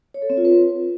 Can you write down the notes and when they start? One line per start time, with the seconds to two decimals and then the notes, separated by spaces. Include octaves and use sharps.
0.14 C#5
0.22 A4
0.30 C4
0.37 F4
0.45 B4